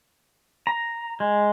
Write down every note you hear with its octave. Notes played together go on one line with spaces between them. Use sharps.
A#5
G#3